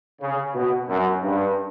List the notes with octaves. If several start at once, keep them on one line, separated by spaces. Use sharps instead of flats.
C#3
B2
F#2
G2